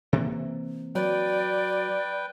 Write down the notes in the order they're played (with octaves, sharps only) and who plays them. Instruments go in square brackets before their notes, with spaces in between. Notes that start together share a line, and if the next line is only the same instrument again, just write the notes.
[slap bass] C3 E3 A#3
[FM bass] F#3 [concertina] B4 G5 [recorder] D5